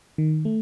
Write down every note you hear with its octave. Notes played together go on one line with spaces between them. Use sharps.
D#3
A3